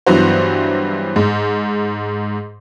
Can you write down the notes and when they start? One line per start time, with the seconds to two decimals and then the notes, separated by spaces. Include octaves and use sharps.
0.07 G2 E3 F#3 B3 F#4 C5
1.16 G#2